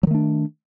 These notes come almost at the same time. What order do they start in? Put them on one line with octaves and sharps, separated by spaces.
F#3 D#3 A3 D4